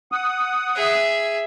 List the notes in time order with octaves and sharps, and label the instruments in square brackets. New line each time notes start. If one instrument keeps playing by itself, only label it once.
[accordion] F#5 D#6
[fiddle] G#4 E5